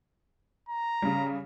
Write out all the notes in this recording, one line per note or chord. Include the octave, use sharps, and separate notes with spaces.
A#5
C#3 G3